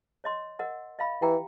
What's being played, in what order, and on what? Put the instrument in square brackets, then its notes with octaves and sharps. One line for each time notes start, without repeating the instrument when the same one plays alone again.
[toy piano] C#5 D#5 C6
A#4 D#5 F#5
D#5 F5 B5
[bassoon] E3 [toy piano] G4 G5 A#5